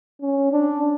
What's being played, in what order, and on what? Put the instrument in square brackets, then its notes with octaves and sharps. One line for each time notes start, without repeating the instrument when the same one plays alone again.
[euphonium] C#4
D4